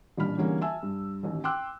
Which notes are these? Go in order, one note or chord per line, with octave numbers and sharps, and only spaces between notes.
A1 A#2 G3 D4 B5 F6
E2 D3 E3 G3 A#3 C#4
E5 G#5 A5 E6
G2
A1 D#2
G5 C6 D6 E6 F#6